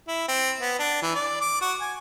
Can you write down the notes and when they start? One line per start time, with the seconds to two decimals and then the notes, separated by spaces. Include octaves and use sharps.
0.08 E4
0.28 C4
0.61 B3
0.79 D4
1.02 E3
1.15 D5
1.41 D6
1.61 F#4
1.81 G#5